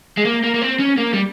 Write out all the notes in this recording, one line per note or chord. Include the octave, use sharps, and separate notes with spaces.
G#3
A#3
A#3
A#3
C4
C#4
A#3
G3